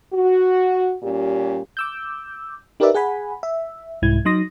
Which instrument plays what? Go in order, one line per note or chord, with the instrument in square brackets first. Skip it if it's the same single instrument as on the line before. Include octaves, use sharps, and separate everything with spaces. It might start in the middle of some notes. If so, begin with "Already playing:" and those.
[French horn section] F#4
A#2 G3 C#4 G4
[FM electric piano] D6 E6 G6
D#4 G4 A#4 B4 D5 E5
G#4 F#5 G#5 B5
E5
C2 G#2 E4 G#6
F#3 D#4 C6 D#6 A#6